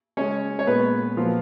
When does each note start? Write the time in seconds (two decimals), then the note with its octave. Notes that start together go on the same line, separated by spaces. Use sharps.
0.17 C#3 G#3 C#4 C#5
0.59 C#5
0.67 A#2 G#3 B3 B4
1.17 A#2 F3 F#3 F4